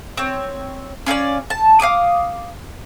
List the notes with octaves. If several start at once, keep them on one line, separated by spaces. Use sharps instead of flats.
C4 C#5
C#4 F4 A4 D5
A5
F5 G#5 D6 D#6